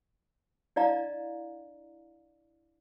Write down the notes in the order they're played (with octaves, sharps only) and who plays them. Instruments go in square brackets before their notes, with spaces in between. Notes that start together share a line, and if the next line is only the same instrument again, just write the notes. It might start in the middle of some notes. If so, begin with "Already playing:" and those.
[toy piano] D4 E4 D5 D#5 F5 A#5